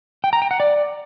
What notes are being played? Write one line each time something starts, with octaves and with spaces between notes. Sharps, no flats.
G5
A#5
G5
F#5
D5